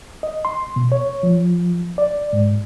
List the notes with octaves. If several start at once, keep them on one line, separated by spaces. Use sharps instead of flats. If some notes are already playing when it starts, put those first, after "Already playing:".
D#5
C6
B2
C#5
F3
D5
G#2